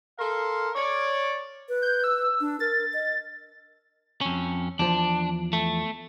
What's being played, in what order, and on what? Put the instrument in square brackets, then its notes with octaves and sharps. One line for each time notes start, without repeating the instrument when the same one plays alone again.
[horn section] A4 A#4 F5 C6
C#5 D5
[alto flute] B4
[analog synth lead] G6
E6
[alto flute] D4
[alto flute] A#4 [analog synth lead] A6
[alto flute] D#5
[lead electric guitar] F2 C#4
[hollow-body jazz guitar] E2 F3 [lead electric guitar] D4
[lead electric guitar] A3